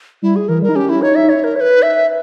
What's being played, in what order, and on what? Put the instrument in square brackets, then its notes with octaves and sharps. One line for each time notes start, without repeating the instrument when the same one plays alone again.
[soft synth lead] G3 [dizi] E4
[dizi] G#4
[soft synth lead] E3 [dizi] A#4
[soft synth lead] G3 [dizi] A#4
[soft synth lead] D#4
[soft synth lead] C#4 [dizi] G4
[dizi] E4
[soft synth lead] D#4 [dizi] C#5
[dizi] E5
C#5
A#4
C#5
B4
E5